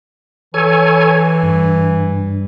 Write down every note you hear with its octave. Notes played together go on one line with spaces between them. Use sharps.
E3 A4 C#5 G#5
G2